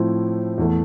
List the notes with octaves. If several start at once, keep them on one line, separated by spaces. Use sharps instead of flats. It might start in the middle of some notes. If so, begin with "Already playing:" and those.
Already playing: A2 F3 C4 E4
E2 E3 A3